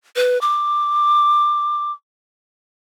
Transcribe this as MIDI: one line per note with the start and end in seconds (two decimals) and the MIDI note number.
0.16 0.40 71
0.41 1.92 86